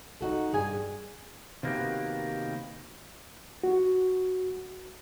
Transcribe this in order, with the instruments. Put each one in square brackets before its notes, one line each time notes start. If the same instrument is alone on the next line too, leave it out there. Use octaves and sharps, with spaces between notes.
[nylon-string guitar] D#4 F#4 A4
G2 G#4 G#5
[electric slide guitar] C3 D#3 A#3 B3 F#4 G4
[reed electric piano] F#4